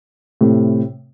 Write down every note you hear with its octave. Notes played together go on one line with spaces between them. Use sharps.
A2 C3